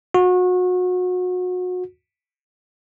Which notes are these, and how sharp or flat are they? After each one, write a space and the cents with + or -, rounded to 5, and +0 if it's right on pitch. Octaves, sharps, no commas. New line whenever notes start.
F#4 -30